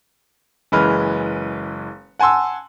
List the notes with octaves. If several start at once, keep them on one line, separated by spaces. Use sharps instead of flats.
F#1 E3 G#3 B4 F6
F#5 G#5 A5 C6 E6